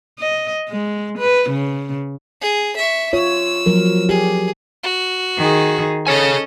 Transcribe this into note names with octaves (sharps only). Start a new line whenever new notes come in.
D#5
G#3
B4
C#3
G#4
E5 C#6
F4 C#5 E6
F3 F#3 A#4
G4 G#4
F#4
D#3 G#4
C#4 G#4 A4 C#5 D#5 G#5